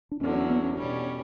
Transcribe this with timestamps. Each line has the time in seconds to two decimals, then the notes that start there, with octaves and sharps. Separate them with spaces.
0.11 D4
0.21 E2 D3 F#3 C#4
0.35 C#4
0.50 B3
0.63 C#4
0.77 B2 G3 C#4 D4